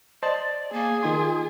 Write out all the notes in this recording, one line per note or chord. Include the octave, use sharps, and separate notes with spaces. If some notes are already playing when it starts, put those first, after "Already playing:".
C5 D5 D#5 A5
A#3 G#4
D#3 D#4 F4 C6